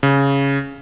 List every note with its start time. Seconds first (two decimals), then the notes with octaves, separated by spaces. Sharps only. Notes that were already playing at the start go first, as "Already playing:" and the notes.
0.03 C#3